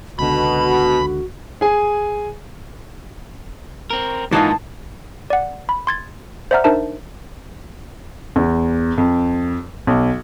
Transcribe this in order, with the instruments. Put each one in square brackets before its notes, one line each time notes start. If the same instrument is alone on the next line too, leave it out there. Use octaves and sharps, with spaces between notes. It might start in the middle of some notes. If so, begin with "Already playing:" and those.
[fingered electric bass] C#2 D3 [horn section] B2 [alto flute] F#4 [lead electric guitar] B5
[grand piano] G#4 G#5
[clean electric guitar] C4 A#4
[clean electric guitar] G#2 A#3 B3 [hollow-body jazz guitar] E3 D#4 F4 [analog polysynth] A5
[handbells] D5 F#5
B5
C6 G#6 A6
C5 D5 E5 F#5 A#5 F6
D4 D#4 A#4 C5 E5 A5
[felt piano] E2
F2
B1